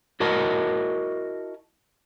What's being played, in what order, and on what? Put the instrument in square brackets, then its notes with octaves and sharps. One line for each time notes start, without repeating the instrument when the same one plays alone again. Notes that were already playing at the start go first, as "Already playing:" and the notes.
[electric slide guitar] E4 F#4 A#4 D#5 A5